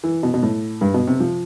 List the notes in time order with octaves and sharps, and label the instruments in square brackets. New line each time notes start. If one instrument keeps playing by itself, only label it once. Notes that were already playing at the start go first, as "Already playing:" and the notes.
[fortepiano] E3
B2
B2
A2
G2
B2
C3
F3